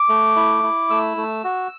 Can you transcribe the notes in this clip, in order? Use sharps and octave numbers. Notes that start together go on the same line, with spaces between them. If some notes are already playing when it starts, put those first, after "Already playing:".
Already playing: D6
A3
E4
E4
A3 E6
A3
F#4